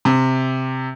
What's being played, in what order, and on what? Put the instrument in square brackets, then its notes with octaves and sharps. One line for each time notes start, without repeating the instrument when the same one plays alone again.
[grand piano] C3